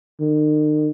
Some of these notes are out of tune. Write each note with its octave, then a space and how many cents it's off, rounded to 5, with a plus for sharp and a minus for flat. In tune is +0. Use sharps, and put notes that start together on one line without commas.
D#3 -40